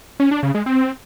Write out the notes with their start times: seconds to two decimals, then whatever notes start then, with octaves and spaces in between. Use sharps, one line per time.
0.20 C#4
0.31 D4
0.43 C#3
0.55 G#3
0.66 C4